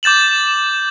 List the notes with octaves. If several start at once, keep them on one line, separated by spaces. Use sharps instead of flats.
D6 G6 A6 E7 F#7